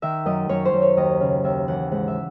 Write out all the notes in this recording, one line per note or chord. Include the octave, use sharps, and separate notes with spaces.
D#3 E5
F#2 D#5
F#2 C#5
C5
F#2
C#5
D#2 D#5
C#3
D#2 E5
E3 F#5
G#2 F#5
E5